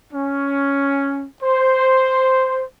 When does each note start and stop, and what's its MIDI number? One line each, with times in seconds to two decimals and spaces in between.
0.12 1.24 61
1.42 2.63 72